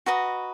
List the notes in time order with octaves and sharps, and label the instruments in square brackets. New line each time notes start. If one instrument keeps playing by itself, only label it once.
[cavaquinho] F#4 B4 D#5 A#5